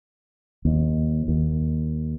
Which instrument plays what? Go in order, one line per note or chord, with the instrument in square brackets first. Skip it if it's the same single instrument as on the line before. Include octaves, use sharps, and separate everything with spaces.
[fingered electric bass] D#2
D#2